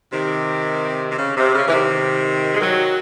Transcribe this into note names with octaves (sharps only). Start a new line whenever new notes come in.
C3 D#3
C3
C#3
C3
C#3
E3
C3 D#3
G#3
D#3 F#3